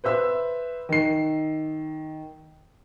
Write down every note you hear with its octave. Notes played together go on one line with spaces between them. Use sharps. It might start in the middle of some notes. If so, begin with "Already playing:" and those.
B4 C5 E5 E6
D#3 C7